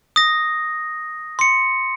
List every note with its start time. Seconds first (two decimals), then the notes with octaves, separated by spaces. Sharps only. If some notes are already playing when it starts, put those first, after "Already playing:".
0.16 D#6 A#6
1.39 C6 C#7